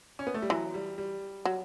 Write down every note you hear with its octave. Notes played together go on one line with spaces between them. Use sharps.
C#4
B3
A3
G3
E3 F#3
G3
G3
F#3